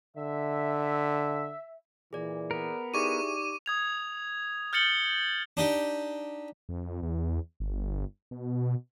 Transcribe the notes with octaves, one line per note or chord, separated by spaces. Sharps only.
D3 E5
A#2 E3 G#4 D5
B3 A#4
D#4 E4 G4 G#4 D5 C#6 D6 D#7
D#6 G#6 F7
F6 G6 A6 C#7 F#7 G7
D4 D#4 G4
F2
E2
G1
B2